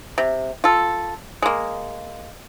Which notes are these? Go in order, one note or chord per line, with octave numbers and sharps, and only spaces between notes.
C3
F4 A4
G#3 A#3